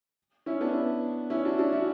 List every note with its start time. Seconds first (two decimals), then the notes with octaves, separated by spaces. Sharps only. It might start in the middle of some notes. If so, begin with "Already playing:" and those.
0.46 C#4 E4
0.61 B3 D4
1.30 C#4 E4
1.45 D4 F#4
1.58 D4 F#4
1.73 C#4 E4